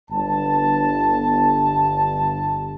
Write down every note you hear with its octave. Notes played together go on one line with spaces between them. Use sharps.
G1 A5